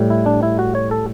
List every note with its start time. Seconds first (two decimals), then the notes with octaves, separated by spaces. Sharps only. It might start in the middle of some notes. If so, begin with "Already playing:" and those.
Already playing: A2 G3
0.10 E4
0.26 D4
0.43 E4
0.59 F#4
0.75 C#5
0.91 A4